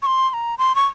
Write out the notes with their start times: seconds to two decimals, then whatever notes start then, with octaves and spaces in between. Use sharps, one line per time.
0.02 C#6
0.06 C6
0.30 C6
0.34 A#5
0.58 C6
0.75 C#6